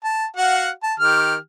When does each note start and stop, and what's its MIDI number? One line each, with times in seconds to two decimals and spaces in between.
0.04 0.26 81
0.37 0.70 66
0.37 0.70 77
0.37 0.70 78
0.83 0.94 81
1.00 1.36 51
1.00 1.36 67
1.00 1.36 89